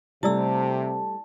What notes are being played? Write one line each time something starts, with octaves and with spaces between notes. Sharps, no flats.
C3 G3 A3 E4 D5 A5 E6